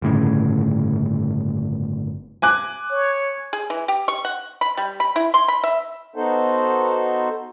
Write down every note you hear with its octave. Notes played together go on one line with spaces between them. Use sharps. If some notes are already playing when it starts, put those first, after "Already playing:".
G1 A2 C#3
G#5 D6 F#6
C#5
G#4
E3
G4
C#6
F#5
B5
G3
B5
E4
C6
B5
E5
B3 D#4 F#4 A4 C5